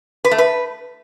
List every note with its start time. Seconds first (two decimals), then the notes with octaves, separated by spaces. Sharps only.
0.25 B4
0.31 A3
0.38 B4